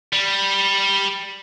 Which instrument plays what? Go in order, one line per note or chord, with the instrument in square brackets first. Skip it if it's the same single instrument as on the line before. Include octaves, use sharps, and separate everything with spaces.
[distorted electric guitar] G3